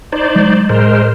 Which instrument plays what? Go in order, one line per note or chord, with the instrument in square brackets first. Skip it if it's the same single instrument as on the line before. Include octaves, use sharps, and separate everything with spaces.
[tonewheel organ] D#4 C5 D5
[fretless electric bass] F#3 G#3
[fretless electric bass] A2 [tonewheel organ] G#3 A#4 C5